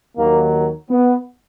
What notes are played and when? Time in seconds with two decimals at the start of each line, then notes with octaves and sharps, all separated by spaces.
0.17 D#2 D#3 F#3 A#3
0.90 B3